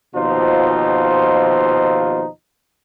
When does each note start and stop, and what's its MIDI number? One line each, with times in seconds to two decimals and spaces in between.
0.15 2.27 39
0.15 2.27 47
0.15 2.27 53
0.15 2.27 63
0.15 2.27 65
0.15 2.27 72